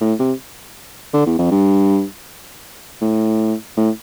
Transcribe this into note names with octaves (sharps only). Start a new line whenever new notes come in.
A2
C3
D3
E2
F2
G2
A2
A2